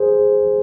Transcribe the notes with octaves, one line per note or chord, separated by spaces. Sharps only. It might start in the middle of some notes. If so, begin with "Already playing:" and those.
Already playing: G#4 C5